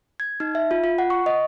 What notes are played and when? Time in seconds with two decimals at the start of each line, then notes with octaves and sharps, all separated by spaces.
0.20 G#6
0.40 D#4
0.55 E5
0.71 F4
0.84 F4
0.99 F#5
1.10 C#6
1.26 D#5